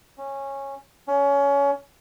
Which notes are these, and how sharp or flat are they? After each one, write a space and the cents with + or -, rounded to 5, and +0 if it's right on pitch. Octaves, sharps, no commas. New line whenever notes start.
C#4 -15
C#4 +25